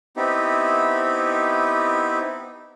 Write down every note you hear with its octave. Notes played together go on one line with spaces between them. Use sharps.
B3 C4 D#4 E4 G4